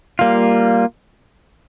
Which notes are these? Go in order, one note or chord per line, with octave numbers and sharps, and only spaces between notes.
G3 A#3 F4